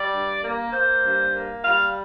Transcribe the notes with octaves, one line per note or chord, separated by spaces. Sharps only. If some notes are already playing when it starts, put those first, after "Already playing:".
Already playing: G3 D5
G2
A#3
A#3 C5
G2
A#3
G3 F5